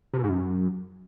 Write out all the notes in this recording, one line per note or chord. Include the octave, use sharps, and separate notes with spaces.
C3
B2
G#2
F#2